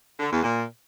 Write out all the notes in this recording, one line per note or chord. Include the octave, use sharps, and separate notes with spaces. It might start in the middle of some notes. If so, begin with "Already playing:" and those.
D3
E2
A#2